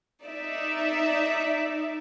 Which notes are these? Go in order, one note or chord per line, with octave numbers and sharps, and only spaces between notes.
D#4 D5 E5